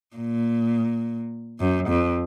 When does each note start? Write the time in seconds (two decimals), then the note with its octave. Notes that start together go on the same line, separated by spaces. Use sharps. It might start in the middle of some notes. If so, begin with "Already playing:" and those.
0.16 A#2
1.60 F#2
1.88 F2